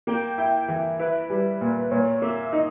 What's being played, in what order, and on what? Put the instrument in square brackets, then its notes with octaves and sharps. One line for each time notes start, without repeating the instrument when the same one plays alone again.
[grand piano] A#3 [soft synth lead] G5
[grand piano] E4 [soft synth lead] G5
[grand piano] E3
[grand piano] E4 [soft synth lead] B4
[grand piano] G3
A#2
[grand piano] A#2 [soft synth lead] C#5
[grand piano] A#3 [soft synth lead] E5
[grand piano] D#4 [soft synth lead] D#5